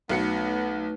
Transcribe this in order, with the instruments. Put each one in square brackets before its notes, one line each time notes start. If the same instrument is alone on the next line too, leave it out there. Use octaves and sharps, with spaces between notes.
[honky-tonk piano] B1 F#4 C#7 [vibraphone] A3 D#4 B4 [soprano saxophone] B3